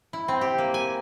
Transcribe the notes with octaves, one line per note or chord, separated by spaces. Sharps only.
E4
C4
G4
A#3
G#5